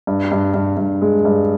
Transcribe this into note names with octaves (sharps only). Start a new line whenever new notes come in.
G2
G2
G2
G2
G#3
G2